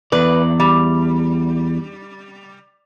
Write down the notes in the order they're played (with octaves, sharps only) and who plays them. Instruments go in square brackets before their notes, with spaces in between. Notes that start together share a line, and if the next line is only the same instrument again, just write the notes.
[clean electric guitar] E2 D5 [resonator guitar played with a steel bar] B4
[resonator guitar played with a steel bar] G3